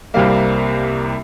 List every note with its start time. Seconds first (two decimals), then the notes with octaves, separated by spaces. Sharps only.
0.14 C2 C3 G3 A#3 F5